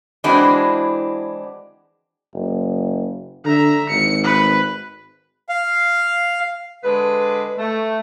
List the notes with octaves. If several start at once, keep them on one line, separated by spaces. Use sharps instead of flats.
E3 G#3 C4 D4 E4 F#4
F#1
D3 E5 A#5
G#1 C#7
B4
F5
D3 G#3 B4
A3